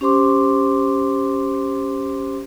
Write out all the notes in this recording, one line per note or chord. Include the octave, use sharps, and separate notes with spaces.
C#4 G4 C5 C6 D6